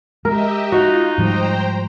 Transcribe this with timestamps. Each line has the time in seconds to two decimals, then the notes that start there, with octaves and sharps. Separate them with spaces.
0.25 G#3 G4 A#4 D#5 E5
0.72 D#4 F4 F#4
1.18 G#2 F3 G3 C5 G5 A#5